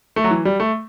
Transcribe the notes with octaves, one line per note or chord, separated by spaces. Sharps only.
A3
F#3
E3
G3
A3